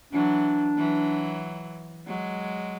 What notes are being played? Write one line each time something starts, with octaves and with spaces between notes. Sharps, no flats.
E3 F#3 D4
E3 F#3
F#3 G#3